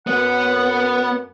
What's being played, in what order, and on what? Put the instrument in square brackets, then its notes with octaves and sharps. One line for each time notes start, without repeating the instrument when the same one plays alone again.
[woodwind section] F#2 F#5 [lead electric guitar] B3